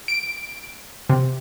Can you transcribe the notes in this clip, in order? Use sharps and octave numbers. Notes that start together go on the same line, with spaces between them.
D7
C3